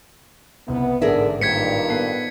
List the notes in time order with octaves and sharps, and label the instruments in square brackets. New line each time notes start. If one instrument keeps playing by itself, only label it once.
[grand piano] F#1 C2 [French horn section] B3
[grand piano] A1 G#2 [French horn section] D3 D4 [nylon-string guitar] G#4 A#4 E5
[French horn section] G2 A#2 D#3 [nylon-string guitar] C5 [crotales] G#6 B6 C#7
[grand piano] B3 A4 C7